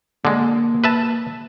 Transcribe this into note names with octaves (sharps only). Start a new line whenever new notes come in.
D3 G#3 A#3
B4 E5 A5